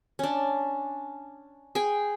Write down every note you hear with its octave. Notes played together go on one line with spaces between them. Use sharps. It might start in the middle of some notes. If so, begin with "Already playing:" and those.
C#4 D4
G#4 G5 G#5